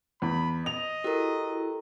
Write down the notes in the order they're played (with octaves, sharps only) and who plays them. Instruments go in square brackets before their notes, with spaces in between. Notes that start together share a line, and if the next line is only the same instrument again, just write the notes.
[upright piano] E2 [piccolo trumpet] B5
[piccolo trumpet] D#5 [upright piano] F7
[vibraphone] E4 F#4 A4 [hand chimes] G4 A#4